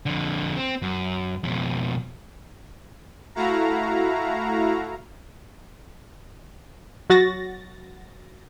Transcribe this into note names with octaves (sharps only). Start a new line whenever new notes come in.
F2 D3
C4
F#2
F2 B2
A3 E4 F#4 F5 A#5
F#3 F#4 A6 A#6